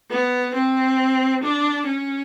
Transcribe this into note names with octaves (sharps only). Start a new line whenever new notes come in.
B3
C4
D4
C#4